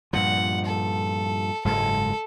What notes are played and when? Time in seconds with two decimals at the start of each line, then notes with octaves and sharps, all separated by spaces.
0.13 G2 A#2 F3 F#5
0.65 A4
1.65 F#1 G#2 G#3 A4